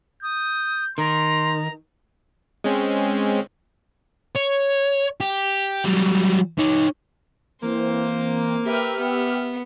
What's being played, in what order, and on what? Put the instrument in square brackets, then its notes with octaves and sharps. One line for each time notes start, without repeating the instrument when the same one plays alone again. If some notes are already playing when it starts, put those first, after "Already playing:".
[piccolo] D#6 [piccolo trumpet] G6
[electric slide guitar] D#3 [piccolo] A#5 [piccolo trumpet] C6
[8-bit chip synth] G#3 C4 C#4
[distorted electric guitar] C#5
G4
F#3 G3
D#4 C#5
[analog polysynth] E3 C4 [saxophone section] A#3 [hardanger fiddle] C5
[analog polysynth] G4 E5 F6 [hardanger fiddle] A#4 B4
[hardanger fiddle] B3